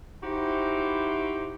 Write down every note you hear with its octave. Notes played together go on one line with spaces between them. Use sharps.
D#4 E4 F#4 G4 C5